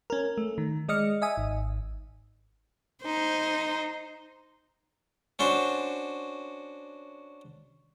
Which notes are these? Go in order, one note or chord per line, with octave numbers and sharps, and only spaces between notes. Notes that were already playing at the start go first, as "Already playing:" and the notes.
C#4 A#4
A3
D#3
G#3 D5 D#5 F6 C#7
D#5 E5 G#5 D#6
G#1
D#4 C5
C#4 D4 F#4 C5